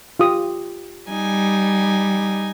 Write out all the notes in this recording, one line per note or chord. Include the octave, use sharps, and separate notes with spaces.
F4 G4 D#6
G3 D#4 G#5